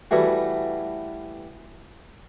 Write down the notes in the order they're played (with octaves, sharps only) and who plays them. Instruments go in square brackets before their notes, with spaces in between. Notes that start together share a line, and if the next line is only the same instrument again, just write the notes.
[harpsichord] E3 G3 A3 F#4